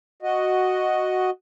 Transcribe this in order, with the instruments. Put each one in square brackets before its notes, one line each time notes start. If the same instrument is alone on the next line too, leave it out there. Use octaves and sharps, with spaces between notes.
[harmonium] F#4 D#5